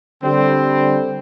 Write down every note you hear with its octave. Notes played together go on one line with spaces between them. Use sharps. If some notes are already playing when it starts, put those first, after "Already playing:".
D3 G3 C4